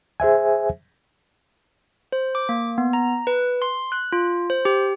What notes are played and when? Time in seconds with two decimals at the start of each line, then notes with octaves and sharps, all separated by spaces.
0.20 G#4 C5 E5 G#5
2.12 C5
2.35 D6
2.49 A#3
2.78 B3
2.93 A#5
3.27 B4
3.62 C6
3.92 F#6
4.12 F4
4.50 C5
4.65 G4